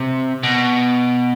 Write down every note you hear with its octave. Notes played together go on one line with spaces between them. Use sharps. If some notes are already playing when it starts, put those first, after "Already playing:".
Already playing: C3
B2